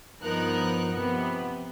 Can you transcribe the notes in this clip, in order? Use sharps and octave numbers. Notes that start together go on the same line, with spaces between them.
G2 F3 B3 D#4 A#4 F#6
C3 F3 B3